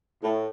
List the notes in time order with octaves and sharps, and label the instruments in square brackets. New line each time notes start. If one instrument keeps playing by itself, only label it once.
[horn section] A2